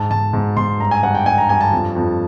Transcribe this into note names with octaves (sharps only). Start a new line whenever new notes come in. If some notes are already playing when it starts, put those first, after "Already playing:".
Already playing: G#2 A5
G#2 A5
G#2
G#2 C6
G2 A#5
G#5
G2 F#5
G5
G2 G#5
A#5
G2 G#5
A5
F2
F2